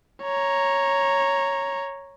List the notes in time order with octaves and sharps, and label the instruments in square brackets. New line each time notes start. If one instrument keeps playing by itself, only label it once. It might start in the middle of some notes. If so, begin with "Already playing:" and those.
[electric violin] C#5 A#5